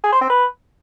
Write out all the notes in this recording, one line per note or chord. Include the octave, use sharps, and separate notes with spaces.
G#4
C5
C4
B4